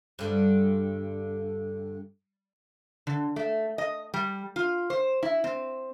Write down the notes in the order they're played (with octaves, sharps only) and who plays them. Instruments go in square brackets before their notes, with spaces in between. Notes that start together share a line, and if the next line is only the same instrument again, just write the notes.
[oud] G2 D3
[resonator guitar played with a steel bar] D3
A3
D#5
G3
F4
C5
E4
C4